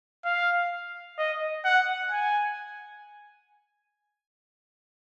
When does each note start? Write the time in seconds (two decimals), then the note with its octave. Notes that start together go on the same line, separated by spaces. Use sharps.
0.25 F5
1.18 D#5
1.64 F#5
2.11 G#5